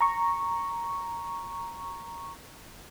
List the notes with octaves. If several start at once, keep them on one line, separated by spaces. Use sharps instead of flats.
A#5 C#6